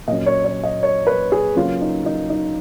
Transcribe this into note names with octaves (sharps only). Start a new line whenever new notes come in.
A#2 F#3 C#4 D#5
C#5
C#5
D#5
C#5
B4
G#4
C#3 F#3 A#3 C#4 F4
D#4
D#4
D#4